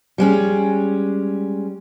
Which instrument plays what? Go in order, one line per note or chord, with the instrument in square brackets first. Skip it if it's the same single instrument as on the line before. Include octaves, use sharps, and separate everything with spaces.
[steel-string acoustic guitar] G3 G#3 C#4